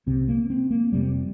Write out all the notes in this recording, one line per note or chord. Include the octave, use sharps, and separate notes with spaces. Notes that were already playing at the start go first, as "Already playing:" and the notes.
C2 C3 C4
A#3
C4
A#3
F1 F2 C3 G3